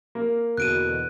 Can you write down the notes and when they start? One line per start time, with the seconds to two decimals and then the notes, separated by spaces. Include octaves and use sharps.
0.15 A#3
0.57 E2 B2 D3 F#6 D7 D#7